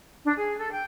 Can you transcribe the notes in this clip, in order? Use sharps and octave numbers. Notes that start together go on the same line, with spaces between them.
D4
G#4
A4
G5